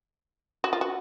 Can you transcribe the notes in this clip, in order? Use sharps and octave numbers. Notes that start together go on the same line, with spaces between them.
F#4
F4
F#4